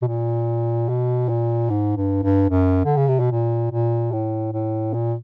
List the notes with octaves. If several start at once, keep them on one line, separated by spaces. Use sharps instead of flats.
B2
A#2
B2
A#2
G#2
G2
G2
F#2
D3
C#3
C3
B2
A#2
A#2
A2
A2
A#2